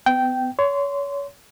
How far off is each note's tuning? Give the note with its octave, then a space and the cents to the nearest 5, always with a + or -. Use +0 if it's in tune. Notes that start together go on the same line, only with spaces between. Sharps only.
B3 +35 G5 -10
C#5 +30 C6 -15